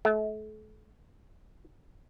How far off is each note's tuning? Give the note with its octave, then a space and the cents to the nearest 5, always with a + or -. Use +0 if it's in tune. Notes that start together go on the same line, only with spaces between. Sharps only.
A3 -35